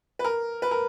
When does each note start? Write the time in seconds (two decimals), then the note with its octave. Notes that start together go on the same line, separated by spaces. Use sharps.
0.19 B4
0.24 A#4
0.62 B4
0.71 A#4